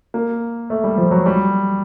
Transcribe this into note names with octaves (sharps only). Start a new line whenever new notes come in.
A#3
A3
G3
F3
F#3
G3